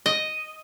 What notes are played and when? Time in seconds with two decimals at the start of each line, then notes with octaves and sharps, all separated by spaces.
0.06 D#5